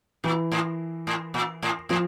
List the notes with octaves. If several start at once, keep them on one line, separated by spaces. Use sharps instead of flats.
A#2 E3
A2
A2
A#2
A2
A2 F3